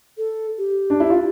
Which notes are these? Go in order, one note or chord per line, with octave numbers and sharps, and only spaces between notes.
A4
G4
D4
E4
F4